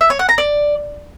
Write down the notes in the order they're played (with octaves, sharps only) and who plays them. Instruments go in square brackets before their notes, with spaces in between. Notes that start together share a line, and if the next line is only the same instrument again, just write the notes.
[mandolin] E5
C#5
F#5
A#5
D5